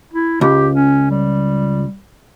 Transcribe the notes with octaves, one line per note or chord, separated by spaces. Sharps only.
E4
C#2 G4
C#4
G3